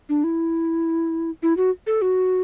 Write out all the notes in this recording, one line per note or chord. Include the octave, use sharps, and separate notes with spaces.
D4
E4
E4
F#4
A4
F#4